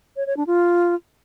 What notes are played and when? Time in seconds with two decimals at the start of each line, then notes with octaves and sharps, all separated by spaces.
0.16 C#5
0.26 C#5
0.37 D4
0.47 F4